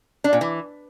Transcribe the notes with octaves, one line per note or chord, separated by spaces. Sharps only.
D4
A#2
E3